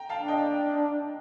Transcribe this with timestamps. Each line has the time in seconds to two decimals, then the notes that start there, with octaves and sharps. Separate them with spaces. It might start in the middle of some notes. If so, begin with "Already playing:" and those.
Already playing: G5 A#5
0.09 F5 A5
0.19 D4
0.28 D#5 G5